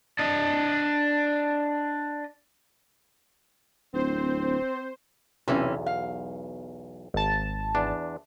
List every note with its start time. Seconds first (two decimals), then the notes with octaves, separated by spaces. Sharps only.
0.19 D4 D#5
3.94 D1 C4 C5
5.48 B1 E2 C3 E3 C#4
5.86 F5
7.14 G#1 A5
7.75 E2 D4